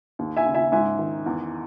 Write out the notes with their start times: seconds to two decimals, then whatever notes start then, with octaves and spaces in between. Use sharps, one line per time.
0.19 D#2
0.36 E5 G#5
0.46 C#3
0.55 E5 G#5
0.72 G#2 E5 G#5
0.99 D#3
1.26 E2